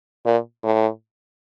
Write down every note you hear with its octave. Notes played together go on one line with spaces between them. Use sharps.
A#2
A2